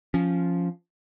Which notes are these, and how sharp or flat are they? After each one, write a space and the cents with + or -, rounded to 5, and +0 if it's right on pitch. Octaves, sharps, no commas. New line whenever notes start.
F3 +0 C#4 +0